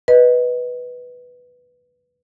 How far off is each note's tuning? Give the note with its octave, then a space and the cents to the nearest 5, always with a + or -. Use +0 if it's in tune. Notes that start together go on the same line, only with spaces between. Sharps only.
B4 +0 D#5 +0